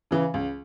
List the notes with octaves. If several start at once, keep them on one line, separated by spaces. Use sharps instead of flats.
C#3 E3
C#2